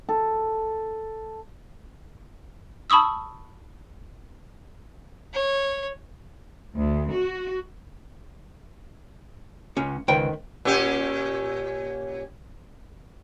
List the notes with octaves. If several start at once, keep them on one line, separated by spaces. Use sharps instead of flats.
A4
A5 B5 C#6 D#6 E6
C#5
D2
F#4
C#2 C#4
C#2 D#3 B4 C5 G5
A#2 C#4 G4